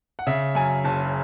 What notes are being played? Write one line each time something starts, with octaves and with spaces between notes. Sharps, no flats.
F#5
C#3 E5
F#2 G#5
F#1 A5